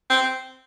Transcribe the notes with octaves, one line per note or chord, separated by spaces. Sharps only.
C4